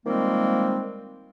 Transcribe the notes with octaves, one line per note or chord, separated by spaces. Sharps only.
D#3 F3 G3 G#3 A#3 C4